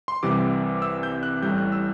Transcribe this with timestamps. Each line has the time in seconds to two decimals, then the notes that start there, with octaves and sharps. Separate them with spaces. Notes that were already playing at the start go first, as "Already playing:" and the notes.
0.08 C6
0.23 C2 C3 E3 G3 D6
0.82 E6
1.03 G6
1.23 F#6
1.42 A1 A2 G3 G6
1.58 F#6
1.72 E6